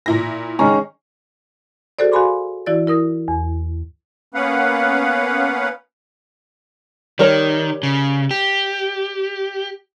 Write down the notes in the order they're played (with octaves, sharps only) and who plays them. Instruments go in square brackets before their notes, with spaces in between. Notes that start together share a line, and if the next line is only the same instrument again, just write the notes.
[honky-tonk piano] A#2 E4 A#6
[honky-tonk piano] D#3 G#3 A#5 [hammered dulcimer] C#4
[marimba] F#4 G#4 A4 C5 D5
F#4 F5 G#5 B5 C6 D6
E3 E4 F#4 D5 E6 A6
E4 A#4 D#6 A#6
E2
[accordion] A#3 B3 C#4 B4 F5 F#5
[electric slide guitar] D#3 [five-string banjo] G3 A#4 C#5
[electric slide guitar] C#3
G4